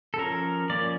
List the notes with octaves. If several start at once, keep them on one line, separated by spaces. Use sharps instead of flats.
A4
F3 C#4 A#4
F3 A#3 C#4 D5